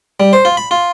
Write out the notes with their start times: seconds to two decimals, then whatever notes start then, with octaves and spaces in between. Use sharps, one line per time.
0.20 G3
0.33 C5
0.45 F4
0.57 B5
0.71 F4